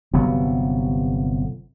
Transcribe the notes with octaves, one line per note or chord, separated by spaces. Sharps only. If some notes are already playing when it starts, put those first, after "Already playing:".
G1 C3 F#3 B3